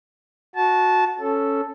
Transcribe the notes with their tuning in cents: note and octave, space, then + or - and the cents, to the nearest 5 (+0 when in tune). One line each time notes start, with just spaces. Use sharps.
F#4 -15 A5 -20
C#4 +0 A4 +0